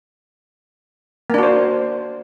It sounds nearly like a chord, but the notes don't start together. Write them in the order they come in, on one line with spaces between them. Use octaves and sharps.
A#3 D4 F#4 C5